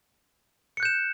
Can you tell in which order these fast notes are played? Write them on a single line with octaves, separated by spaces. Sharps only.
C#7 F#6 G6 E7